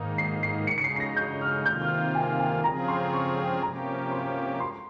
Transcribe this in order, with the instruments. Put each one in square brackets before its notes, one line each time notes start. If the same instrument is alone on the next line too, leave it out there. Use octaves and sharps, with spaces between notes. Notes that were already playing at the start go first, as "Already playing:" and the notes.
Already playing: [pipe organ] G#2 D#3 A#3 D#4
[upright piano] C7
C7
[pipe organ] C#3 [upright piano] C#7
[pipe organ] G#3 D#4
[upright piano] C#7
C7
C7
A#6
G6
F6
[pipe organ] C3 D#3 A#3 F4 [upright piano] G6
[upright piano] F6
G#5
G#5
[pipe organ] C#3 F3 C4 F4 G#4 [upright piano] A#5
[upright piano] C6
C#6
G5
[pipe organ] C3 F3 A#3 C#4 G4 [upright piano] A#5
[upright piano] C6
C6